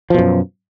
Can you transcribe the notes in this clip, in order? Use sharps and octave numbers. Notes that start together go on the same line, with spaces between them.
F#2 B2 F3